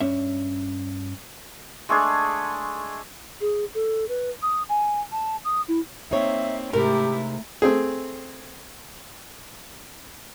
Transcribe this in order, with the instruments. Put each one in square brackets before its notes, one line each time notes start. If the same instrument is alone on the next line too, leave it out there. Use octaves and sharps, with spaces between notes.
[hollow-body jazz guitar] G2 C#4 E5
[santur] G#3 A3 D4 G#4
[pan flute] G#4
A4
B4
D#6
G#5
A5
D#6
E4
[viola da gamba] A#3 C4 [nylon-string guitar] D#4 C#5 [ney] E5
[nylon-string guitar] G#2 C3 [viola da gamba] A3 E4 [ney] G4 [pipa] A#4
[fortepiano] A3 C4 G#4